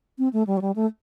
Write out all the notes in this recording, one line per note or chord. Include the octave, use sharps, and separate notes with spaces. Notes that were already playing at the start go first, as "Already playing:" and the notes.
C4
A3
G3
F#3
G3
A3